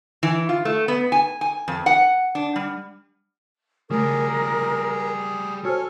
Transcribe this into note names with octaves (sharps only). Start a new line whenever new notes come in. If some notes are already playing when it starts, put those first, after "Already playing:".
E3
F4
A3
B3
G#5
G#5
F2
F#5
D4
G3
C#3 F3 G3 A3 G#4 A#4
F#4 A4 C5 C#5 G#5 F6